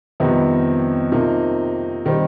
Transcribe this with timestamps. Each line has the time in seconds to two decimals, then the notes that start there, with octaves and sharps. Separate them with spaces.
0.20 F2 C3 D#3 G3 B3
1.12 C3 F3 A#3 D#4
2.06 D#3 G3 C4